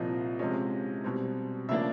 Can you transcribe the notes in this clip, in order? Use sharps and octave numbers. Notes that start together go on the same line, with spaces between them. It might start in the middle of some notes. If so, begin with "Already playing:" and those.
Already playing: C2 A#2 F3 D#5
C3 F3 G#3 C#4 D#5
B2 G3 C4
C#3 F3 A#3 D4 E5